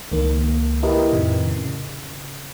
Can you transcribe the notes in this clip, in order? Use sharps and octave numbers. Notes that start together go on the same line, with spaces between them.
C#2 D#3 A#3
E4 G4 A#4 B4 D#5
F2 A2 C3 D#3
C#3